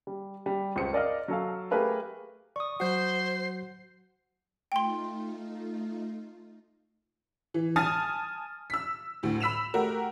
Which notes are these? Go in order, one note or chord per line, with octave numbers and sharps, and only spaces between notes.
G3
G3
C#2 C5 C#7
A#4 D5 D#5 F5 F6
F#3 A4 F5
A3 G4 G#4 A#4 B4 F5
D5 C#6 D#6
F#3 F#4 C5 F#5 G6 C7
A3 D#4 F4 G5 C6
E3
G#5 A5 D#6 F6 A6
E6 B6
D2 A2
B5 E6 B6 E7 F7
A3 F#4 G4 A#4